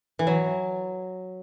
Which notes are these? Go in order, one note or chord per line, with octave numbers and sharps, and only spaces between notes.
E3
F#3